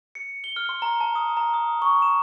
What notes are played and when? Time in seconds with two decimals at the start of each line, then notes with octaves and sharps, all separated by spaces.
0.15 C#7
0.44 G7
0.56 F6
0.69 C6
0.82 A#5
1.01 A5
1.16 D#6
1.37 A#5
1.54 D#6
1.82 C#6
2.02 E7